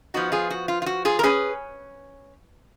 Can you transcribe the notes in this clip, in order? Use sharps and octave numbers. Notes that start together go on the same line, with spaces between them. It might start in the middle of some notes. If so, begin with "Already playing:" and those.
F3 B3 D#4 F#4
F4 G#4
F#4
F4
F4
F#4
F4 G#4
A#4
A#3 C#4 G#4 B4